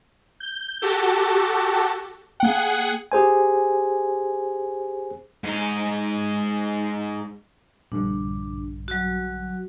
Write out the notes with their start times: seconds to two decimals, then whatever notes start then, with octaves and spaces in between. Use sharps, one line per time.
0.40 G6
0.82 F#4 G4 A4
2.40 A#3 G#4 F#5 G5
3.12 G4 G#4 C5 G#5
5.44 G#2 D#4
7.92 A#1 G2 D3 D4
8.88 F#3 F#4